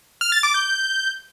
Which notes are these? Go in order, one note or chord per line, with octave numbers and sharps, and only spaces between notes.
F6
A6
D6
G6